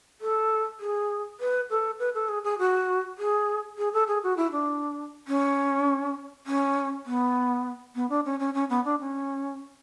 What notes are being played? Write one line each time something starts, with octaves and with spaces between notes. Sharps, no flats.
A4
G#4
B4
A4
B4
A4
G#4
G#4
F#4
G#4
G#4
A4
G#4
F#4
E4
D4
C#4
C#4
B3
B3
D4
C#4
C#4
C#4
B3
D4
C#4